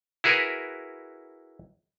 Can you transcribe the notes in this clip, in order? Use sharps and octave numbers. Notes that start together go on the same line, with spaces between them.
E4 F#4 G#4 A#4 B4